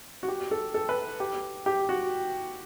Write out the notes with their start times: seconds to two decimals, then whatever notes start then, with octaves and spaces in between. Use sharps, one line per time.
0.23 F#4
0.28 G4
0.51 A4
0.74 A4
0.89 B4
1.20 G4
1.66 G4
1.89 F#4